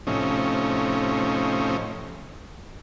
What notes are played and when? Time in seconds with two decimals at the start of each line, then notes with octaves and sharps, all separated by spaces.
0.07 A2 C3 F3 C#4 D#4